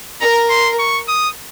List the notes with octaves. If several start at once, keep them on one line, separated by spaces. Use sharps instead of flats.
A#4 A#5
C6
C#6
D#6